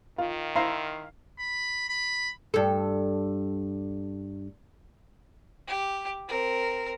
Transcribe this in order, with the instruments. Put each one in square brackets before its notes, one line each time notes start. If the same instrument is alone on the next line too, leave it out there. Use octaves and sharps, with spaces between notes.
[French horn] D#3 [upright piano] F4
[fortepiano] E4 C5 A#5 [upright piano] F5 C7
[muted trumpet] B5
B5
[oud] G2 A4
[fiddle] G4
C4 A#4